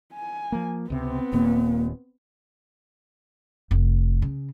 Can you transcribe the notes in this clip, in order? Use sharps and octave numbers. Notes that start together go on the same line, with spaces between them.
G#5
F3 A#3
C#2 C3 B3 C4
D#1 D#2 A#2 A#3
F1
C#3